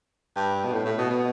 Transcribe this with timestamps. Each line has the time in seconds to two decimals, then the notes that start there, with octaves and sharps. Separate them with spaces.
0.36 G2
0.64 B2
0.73 A2
0.85 A2
0.98 B2
1.10 B2